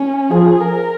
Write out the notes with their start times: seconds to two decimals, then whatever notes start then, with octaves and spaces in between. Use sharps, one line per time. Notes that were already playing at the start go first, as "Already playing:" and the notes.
Already playing: C#4
0.31 F3 G#4
0.60 A#4